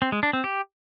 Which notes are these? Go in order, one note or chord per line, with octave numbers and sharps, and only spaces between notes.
C4
G#3
D4
C4
G4